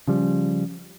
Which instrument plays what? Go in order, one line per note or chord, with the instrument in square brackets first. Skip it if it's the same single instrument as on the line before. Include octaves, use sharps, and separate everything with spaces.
[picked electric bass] C#3 F3 G3